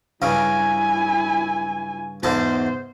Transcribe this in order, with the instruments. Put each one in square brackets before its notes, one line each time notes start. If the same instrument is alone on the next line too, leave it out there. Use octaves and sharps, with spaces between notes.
[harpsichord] G2 C#3 [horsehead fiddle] E4 G#5
[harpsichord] E2 G#2 A5 [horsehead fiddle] C5